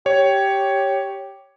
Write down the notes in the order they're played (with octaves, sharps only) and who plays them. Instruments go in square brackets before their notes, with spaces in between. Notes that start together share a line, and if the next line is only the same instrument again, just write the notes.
[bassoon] G4 [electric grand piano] C#5